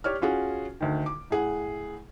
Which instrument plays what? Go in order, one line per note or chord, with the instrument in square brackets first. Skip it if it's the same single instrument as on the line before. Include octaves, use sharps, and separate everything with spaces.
[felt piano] G4 C#5 D5 F6
C#4 F4 F#4 G#4
D2 D#3
D6
A2 G#4 F#5